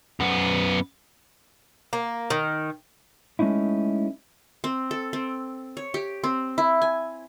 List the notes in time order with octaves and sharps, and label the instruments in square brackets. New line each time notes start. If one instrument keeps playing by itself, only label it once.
[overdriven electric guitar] F#2 B3
[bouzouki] A#3
D#3
[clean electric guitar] G#3 A3 C#4 D#4 E4
[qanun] C4
A4
C4
C#5
G4
C4
E4
G#5